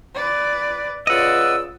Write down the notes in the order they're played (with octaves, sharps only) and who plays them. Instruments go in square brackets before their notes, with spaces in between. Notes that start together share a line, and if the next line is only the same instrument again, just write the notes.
[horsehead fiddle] B4 D5
[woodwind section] C#3 B4 E6 [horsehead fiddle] F4 D5 [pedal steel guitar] D#5 F#5